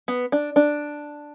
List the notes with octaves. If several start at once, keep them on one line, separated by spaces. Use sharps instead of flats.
B3
D4
D4